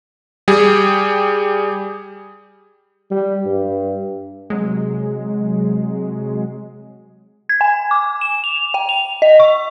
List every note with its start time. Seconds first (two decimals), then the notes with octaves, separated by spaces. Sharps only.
0.48 G3 G4 G#4
3.10 G3
3.45 G2
4.50 C3 F#3 G#3
7.49 G#6
7.61 G#5
7.91 D6
8.21 E7
8.44 F7
8.74 G5
8.89 F7
9.22 D#5
9.40 C#6